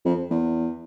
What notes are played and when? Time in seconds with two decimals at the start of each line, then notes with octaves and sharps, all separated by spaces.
0.05 F2
0.31 E2